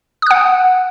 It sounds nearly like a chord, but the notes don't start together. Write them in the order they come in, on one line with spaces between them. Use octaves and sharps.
D#6 F#6 F#5